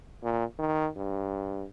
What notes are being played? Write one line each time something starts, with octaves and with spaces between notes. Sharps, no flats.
A#2
D#3
G2